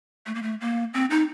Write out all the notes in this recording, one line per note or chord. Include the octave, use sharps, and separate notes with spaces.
A3
A#3
A3
A#3
C4
D#4